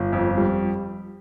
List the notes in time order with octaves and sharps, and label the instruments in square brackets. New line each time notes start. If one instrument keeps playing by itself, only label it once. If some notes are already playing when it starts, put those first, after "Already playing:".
Already playing: [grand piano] G1
F2
G3